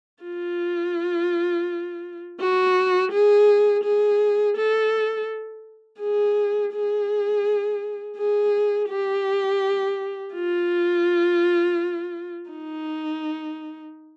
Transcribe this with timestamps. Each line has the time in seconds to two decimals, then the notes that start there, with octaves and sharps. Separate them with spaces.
0.24 F4
2.40 F#4
3.12 G#4
3.84 G#4
4.57 A4
6.00 G#4
6.73 G#4
8.17 G#4
8.89 G4
10.34 F4
12.50 D#4